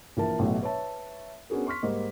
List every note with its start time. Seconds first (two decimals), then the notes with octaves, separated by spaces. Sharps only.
0.17 A#1 E3 A#4 A5
0.39 A1 B2 F#3 A3 B3 E4
0.62 B4 C#5 E5 A5
1.50 B3 C#4 D4 F#4 G#4 A#4
1.67 C6 C#6 F6 B6
1.83 G#2 G3 A#3 D#5